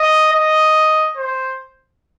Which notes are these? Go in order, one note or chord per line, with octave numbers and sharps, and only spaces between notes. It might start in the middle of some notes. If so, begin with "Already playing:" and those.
Already playing: D#5
D#5
C5